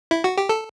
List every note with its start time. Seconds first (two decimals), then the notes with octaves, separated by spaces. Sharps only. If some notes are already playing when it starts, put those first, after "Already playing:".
0.11 E4
0.24 F#4
0.38 G4
0.49 A4